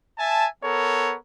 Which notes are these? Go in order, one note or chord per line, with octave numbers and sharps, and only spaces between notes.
E5 G#5 A5
B3 A4 A#4 C#5